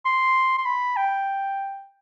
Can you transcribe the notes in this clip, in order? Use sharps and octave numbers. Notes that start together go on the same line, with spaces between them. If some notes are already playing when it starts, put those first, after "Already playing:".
C6
C6
B5
G5